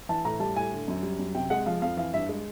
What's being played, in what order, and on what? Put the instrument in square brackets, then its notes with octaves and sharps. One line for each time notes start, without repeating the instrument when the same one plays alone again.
[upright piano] E3 A5
A2 A#5
G3 A5
A2 G#5
D3
F#2
G3
F#2
C3 G5
G#3 F#5
F3 F5
F2 F5
E3 F5
G2 E5
G#3